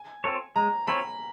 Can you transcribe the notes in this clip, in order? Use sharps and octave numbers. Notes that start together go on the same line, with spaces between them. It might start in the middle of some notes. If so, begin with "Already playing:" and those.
Already playing: G#5
C4 F4 A4 C#5
G#3 A#5
C4 F4 A4 C#5 B5